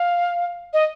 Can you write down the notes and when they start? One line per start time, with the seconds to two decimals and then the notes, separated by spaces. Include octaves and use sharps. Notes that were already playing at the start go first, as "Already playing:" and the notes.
Already playing: F5
0.73 D#5